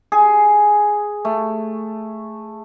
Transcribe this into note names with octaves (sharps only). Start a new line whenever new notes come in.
G#4
A3